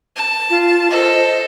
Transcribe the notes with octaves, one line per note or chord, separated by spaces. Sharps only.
A5
F4
A4 C5 D#5